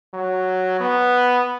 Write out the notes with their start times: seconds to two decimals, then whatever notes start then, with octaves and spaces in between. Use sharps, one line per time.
0.14 F#3
0.80 B3